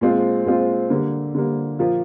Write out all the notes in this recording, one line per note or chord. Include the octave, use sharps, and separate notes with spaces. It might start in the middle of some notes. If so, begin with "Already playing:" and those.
A#2 G#3 C4 F4
A#2 G#3 C4 F4
D3 G3 A#3
D3 G3 A#3
A#2 F3 A#3 F4